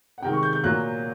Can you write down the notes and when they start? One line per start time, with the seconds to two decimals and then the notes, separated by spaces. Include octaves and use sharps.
0.18 F#5
0.22 C3 D#3 G#3 G5
0.33 C#6
0.43 G6
0.53 G6
0.63 A#2 F#3 A#3 F#6